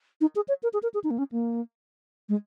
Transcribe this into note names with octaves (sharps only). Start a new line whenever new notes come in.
D#4
G#4
C#5
A#4
G#4
A#4
G#4
D#4
A#3
C#4
A#3
G#3